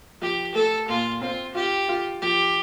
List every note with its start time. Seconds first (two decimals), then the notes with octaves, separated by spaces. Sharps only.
0.22 F3 G4
0.55 A3 A4
0.88 A#2 F4
1.21 C4 F4
1.55 F4 G4
1.89 F4
2.22 F3 G4